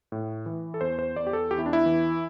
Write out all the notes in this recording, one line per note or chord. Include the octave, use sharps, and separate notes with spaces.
A2
E3
A4
E2 C5
C5
E2 D5
G4
A4
E2 G4
E4
D4
E4
E3